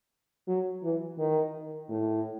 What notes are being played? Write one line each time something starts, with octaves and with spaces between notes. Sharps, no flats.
F#3
E3
D#3
A2